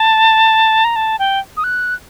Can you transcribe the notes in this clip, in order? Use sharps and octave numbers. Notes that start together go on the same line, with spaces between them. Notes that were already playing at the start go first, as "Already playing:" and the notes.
Already playing: A5
A#5
A5
G5
D#6
F#6